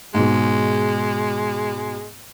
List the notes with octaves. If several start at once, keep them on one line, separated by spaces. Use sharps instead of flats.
G#2 B2 G#3